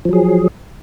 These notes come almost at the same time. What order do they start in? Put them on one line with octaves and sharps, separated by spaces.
F3 F#3 G#4